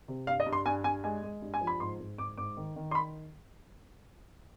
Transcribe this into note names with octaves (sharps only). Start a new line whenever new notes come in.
C3
G2 F5
D#5
G2
C6
G2 G#5
G2 G#5
G#3 G#5
G#3
G2
G#5
F3
B5
G#2 C6
G#2
G#2 D6
G#2 D6
D#3
D#3
C6
B5